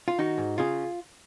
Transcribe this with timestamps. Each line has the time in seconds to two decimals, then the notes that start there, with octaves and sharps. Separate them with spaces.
0.08 F4
0.18 D#3 D#4 F#4
0.38 G#2
0.58 C#3 F4 G#4